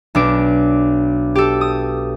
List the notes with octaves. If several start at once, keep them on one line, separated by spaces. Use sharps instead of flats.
B1 D4 D7
G4 A4
D#6